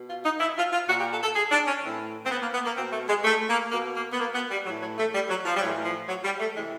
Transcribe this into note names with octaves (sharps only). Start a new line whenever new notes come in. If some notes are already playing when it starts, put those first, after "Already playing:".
Already playing: B2
F4
D#4
E4
F4
F4
A#2 F#4
G4
A4
A4
G#4
D4
C#4
A2 E3 C4
C4
B3
A#3
B3
A#3
B2 C4
A3
G#3
A3
A#3
B2 A#3
A#3
B3
A#3
B3
G3
A2 E3 F#3
F#3
A3
G3
F#3
F3
G3
A2 E3 F#3
F3
F#3
G3
A3
C3 E3 G#3